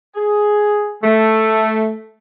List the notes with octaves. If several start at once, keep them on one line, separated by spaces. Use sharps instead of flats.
G#4
A3